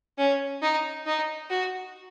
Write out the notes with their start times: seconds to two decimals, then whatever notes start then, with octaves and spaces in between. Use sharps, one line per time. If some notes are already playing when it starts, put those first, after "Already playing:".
0.18 C#4
0.62 D#4
1.06 D#4
1.50 F#4